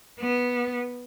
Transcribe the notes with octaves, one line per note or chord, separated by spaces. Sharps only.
B3